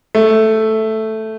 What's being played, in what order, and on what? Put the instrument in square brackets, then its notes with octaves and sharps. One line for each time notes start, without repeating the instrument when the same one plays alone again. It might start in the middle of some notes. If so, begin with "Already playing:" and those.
[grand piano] A3